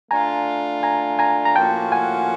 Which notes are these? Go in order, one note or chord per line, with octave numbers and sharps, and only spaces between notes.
A3 D4 F4 G#5 A#5
G#5 A#5
G#5 A#5
A#5
A2 F3 A#3 C#4 F#4 G5 A5
F#5 G#5